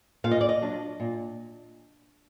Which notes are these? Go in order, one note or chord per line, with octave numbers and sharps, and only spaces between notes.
A#2 F5
D#5
D5
D#5
F#3 D4 F4
A#2